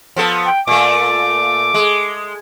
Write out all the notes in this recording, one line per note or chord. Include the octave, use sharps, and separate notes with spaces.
F3 B3 A4
G5
A#2 A3 D6
G#3